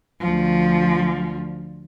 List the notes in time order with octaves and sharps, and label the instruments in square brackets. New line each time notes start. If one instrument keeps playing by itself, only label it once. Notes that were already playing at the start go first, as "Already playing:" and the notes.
[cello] D2 F3